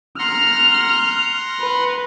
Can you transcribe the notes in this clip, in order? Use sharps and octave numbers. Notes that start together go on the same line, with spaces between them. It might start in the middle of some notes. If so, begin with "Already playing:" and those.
F#5 A#5 C6 F6
B4